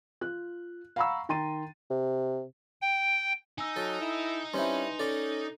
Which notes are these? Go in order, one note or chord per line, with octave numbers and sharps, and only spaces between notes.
F4 F#6
F5 F#5 A#5 B5 C#6 E6
D#3 G5 A#5 C6 A6 D#7
C3
G5
D#4 G#5 E6
F#3 A4
E4
G3 C4 C#4 E4 B4 G#5 C6
C#4 A4 D5 A#5